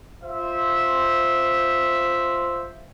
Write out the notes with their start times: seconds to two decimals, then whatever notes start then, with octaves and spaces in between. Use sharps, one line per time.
0.23 F4 C5 E5